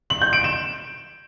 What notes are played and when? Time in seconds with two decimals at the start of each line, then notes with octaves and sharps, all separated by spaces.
0.10 F#7
0.22 G6
0.33 D7
0.44 E7